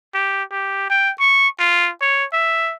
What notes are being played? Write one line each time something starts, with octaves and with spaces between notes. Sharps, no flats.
G4
G4
G5
C#6
F4
C#5
E5